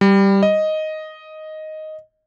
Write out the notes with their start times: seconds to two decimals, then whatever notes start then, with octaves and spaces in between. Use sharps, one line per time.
0.01 G3
0.43 D#5